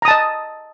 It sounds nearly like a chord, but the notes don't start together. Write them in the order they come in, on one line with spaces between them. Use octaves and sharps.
A#5 D#6 A5 D#5